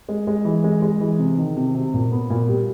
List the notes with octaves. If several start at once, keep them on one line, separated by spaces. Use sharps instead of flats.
G#3
G#3
E3
G#3
G#3
E3
C3
D#3
C3
C3
A#2
B3
A#2
G3